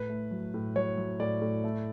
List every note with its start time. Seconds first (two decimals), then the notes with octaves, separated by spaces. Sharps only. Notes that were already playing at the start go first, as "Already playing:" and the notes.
Already playing: A2 B4
0.10 A3
0.31 F#3
0.54 A2
0.76 F#3 C#5
0.97 F#3
1.20 A2 D5
1.41 A2
1.64 A3